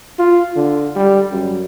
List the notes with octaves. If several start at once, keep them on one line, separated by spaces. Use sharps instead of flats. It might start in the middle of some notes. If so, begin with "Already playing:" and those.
F4
D3
G3
F#2